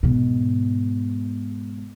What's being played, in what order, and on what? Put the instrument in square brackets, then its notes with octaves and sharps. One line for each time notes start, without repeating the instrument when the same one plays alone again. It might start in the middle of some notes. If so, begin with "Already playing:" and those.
[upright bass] G#2 B2